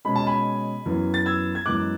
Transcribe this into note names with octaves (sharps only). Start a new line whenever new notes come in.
B2 G#3 C#4 B5
A5
G#5 B5
F#2 E3 B3
A6
E6 G#6
G#6
F#2 E3 G#3 B3 D6 F#6